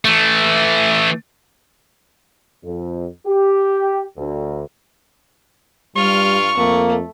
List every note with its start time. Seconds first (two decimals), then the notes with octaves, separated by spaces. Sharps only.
0.05 E3 A3
2.64 F2
3.26 G4
4.17 D2
5.96 G2 G3 F4 C#6 F6
6.57 F2 A3 A#3